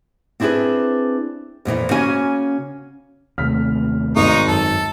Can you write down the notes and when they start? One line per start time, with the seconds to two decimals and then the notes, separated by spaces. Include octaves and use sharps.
0.40 C4 D4 E4 F#4 G#4 B4
1.65 F2 A#2 D3 E3
1.91 C#3 A#3 C#4 F#4 G#5
3.38 D#2 C3 A3 F6 B6
4.16 G#1 G#3 D#4 C#6
4.48 F#2 A4